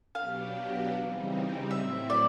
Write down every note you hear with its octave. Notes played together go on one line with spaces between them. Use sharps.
B2 F#3 B3 D4 G4 F5
C#3 E3 G3 C4 D#4
A2 F#3 A3 C4 E4 E5
D5